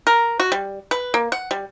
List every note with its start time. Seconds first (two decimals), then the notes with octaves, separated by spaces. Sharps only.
0.07 A#4
0.40 F#4
0.52 G3
0.91 B4
1.14 A#3
1.32 F#5
1.51 G3